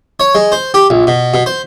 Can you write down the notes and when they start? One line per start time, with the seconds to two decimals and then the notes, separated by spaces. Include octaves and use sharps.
0.20 C#5
0.35 G#3
0.52 C5
0.74 G4
0.90 A#1
1.07 B2
1.34 B2
1.46 C5